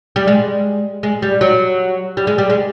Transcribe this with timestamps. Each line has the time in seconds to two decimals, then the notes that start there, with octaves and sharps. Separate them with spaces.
0.16 G3
0.27 G#3
1.03 G#3
1.22 G3
1.41 F#3
2.17 G3
2.27 G#3
2.38 G3
2.50 G#3